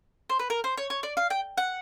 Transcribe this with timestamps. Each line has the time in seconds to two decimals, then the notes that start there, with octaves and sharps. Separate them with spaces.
0.29 C5
0.39 B4
0.50 A#4
0.64 C5
0.77 C#5
0.90 C#5
1.03 D5
1.17 F5
1.30 G5
1.57 F#5